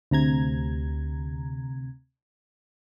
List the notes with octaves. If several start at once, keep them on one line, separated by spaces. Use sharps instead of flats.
D2 C3 A#5 G#6